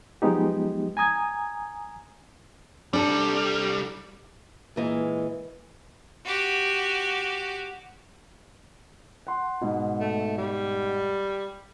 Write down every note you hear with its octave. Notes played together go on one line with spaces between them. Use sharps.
F3 F#3 G#3 B3 D#4 G4
G#5 A#5 D#6 G#6
C2 G3 D4 A4
A#2 E3 G#3
F#4 G4
F#5 C6
G#2 B2
A3
G3